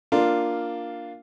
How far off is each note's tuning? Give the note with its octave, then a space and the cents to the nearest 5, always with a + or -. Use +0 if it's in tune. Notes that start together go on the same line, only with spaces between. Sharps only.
A#3 +0 D4 +5 F4 +0